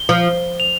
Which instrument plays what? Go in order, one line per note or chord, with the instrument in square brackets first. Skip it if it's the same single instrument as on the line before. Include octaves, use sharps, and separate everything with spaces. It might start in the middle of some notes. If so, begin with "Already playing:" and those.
Already playing: [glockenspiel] G7
[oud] F3
[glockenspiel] F7